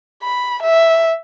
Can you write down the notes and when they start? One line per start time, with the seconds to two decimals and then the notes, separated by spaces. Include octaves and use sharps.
0.23 B5
0.63 E5